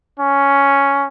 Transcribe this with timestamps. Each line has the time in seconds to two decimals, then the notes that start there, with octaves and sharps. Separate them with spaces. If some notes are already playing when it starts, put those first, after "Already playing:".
0.19 C#4